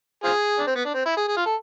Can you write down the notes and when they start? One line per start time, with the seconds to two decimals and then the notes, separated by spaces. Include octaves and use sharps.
0.24 C4 F4 G#4
0.59 D4
0.67 C4
0.75 B3
0.85 D4
0.94 C4
1.06 E4
1.17 G#4
1.28 G#4
1.37 F4
1.46 A4